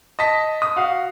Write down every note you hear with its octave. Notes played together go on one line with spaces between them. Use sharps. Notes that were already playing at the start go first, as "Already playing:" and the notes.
D#5 A5 B6
D#6
F#4 F5